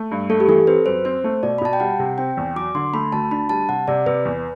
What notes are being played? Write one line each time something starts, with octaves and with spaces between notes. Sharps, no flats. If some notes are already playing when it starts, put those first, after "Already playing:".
Already playing: A3
G2
A3 A4
G4
E3 A4
C4 B4
F#2 C5
C4 C5
A3
B2 D5
B5
B2 A5
G5
G3 F#5
C3
C4 G5
E2
F#3 D6
D3 C6
A3 B5
D2 A5
D4 B5
G3 A5
C3 F#5
C3 D5
C3 B4
E2